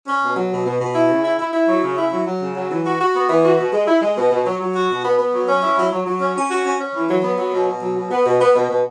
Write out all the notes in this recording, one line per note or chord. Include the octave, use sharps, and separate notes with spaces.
C#4
B2
F#3
B2
B2
B2
E4
C#3
E4
E4
E4
F#3
C#3
E4
F#3
F#3
C#3
F#3
E3
F#4
F#4
B3
E3
F#4
B2
G#3
E4
G#3
B2
B2
F#3
F#3
F#4
B2
B3
B3
F#3
C#4
E4
F#3
F#3
F#3
C#4
C#4
F#4
C#4
C#4
E3
F#3
B3
F#3
B2
B2
F#3
B2
B3
B2
B3
B2
B2